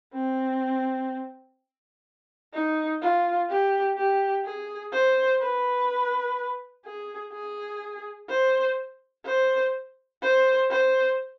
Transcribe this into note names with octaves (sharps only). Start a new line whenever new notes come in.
C4
D#4
F4
G4
G4
G#4
C5
B4
G#4
G#4
C5
C5
C5
C5